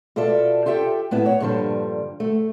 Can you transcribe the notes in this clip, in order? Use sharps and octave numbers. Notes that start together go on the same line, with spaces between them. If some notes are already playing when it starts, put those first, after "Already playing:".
B2 F4 A4 D5 E5
F4 G4 A4 E5 G5
A2 B3 E4 E5
C#5
G2 A#2 D3 F3 G3
A3